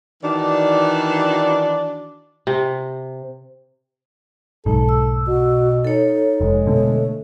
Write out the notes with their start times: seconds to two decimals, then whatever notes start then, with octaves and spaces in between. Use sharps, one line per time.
0.22 D#3 E3 D4 F#4 D5
2.47 C3
4.66 B1 G#2 A4
4.89 E6
5.27 B2 F#4
5.85 D#4 A4 C#5
6.41 F1 G#3
6.67 B2 D3 A3